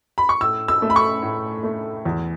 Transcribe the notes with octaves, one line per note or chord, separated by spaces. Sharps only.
B5
C#6
A2 E6
E6
A3
B5
C#6
A2
A3
E2